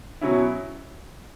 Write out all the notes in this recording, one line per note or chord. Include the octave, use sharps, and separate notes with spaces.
B2 F#3 C#4 E4